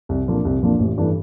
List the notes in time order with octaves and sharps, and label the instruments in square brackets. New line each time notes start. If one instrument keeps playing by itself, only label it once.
[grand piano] C2
A#2 F3 A#3 D4
C2
A#2 F3 A#3 D4
A1
G2 E3 A3 D4